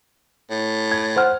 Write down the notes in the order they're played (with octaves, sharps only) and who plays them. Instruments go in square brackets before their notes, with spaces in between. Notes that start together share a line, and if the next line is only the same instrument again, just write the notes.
[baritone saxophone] A2
[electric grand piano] G#6
C5 F#5 F6